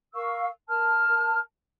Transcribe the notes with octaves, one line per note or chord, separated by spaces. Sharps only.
A#4 F5 C#6 E6
A#4 A5 F6